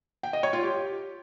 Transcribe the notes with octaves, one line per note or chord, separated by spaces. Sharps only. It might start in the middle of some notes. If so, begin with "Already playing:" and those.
G5
D#5
C#5
F4
G4